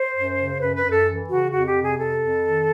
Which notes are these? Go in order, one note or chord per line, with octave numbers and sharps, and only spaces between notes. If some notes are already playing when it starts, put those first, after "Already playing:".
Already playing: C5
F#2
C#3
F#2 B4
B4
F#2
A4
E3
C#3 F#4
F2 F#4
G4
C3
G#4
F2 A4
F2
D#3